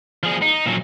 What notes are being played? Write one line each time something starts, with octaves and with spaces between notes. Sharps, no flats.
F3 G#4
D#4
A#2 F#3